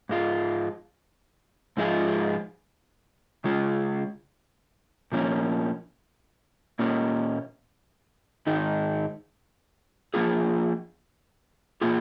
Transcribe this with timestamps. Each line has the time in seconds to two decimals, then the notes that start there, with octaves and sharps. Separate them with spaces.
0.09 G#2 G#3 F4
1.77 G#2 F3 G#3 F4 G#4
3.44 C#3 G#3 F4 G#4
5.12 A#2 F3 A#3 C#4
6.79 A#2 A#3 C#4
8.47 G#2 D#3 G#3 D#4
10.14 F3 A#3 F4 G#4
11.81 A#2 A#3 F4 G#4